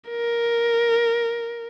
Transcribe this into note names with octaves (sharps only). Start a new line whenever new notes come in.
A#4